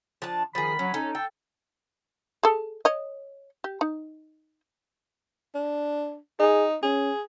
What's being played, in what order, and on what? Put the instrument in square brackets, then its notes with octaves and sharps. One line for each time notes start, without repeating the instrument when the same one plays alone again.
[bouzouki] F3 D4 A5
[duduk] D#3 [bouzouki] F3 G#4 [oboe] B5
[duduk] F#3 [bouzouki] C#4
[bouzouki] C#4 A4 [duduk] D#4
[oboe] A4 [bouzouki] G5
[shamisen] G#4 A4
C#5 D#5
G4
D#4
[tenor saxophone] D4
[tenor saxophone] D#4 [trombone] G#4
[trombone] C#4 [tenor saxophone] G#4